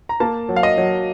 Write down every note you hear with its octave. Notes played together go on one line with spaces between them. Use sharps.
A#5
A#3 A5
F#3
F5
D#5
F#3